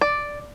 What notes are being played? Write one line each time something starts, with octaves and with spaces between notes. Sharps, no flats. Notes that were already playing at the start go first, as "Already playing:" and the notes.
D5